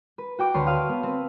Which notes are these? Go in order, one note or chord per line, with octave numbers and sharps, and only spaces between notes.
B4
F#4 G5 D6
D2 B4 C#5 A5 C6 C#6
F5 D#6
B3
C4 B4